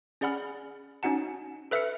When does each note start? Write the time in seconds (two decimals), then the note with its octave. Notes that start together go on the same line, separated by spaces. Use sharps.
0.21 C#4 G#4 D5 F#5 B5 F6
1.03 C#4 D#4 F#4 F#5 A5
1.71 A4 B4 E5 E6 F6 C#7